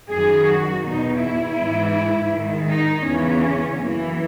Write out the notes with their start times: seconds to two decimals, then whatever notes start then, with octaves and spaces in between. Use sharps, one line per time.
0.11 F#2 D#3 G#4
0.49 F#4
0.85 E2 B2 D#4
1.21 E4
1.59 G#2 E3
2.33 G#2 D#3
2.69 D#4
3.06 E2 C#3 E3 C#4
3.79 F#2 E3 A#3